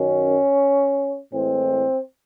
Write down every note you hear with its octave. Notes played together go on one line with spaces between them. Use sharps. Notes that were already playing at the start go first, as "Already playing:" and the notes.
Already playing: F#2 D#3 F#3 C#4
A2 E3 G#3 C4